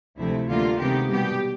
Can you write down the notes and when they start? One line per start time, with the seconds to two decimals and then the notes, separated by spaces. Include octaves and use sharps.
0.17 D2 C3 F3 A3 E4
0.48 D2 D3 G3 A#3 F4
0.79 C3 D#3 G#3 B3 G4
1.10 B2 G3 B3 G4